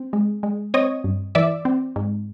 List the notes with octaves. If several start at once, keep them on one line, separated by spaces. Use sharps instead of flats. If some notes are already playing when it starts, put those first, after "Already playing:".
Already playing: C4
G#3
G#3
C4 C#5 D#5
G2
E3 D5 E5
C4
G#2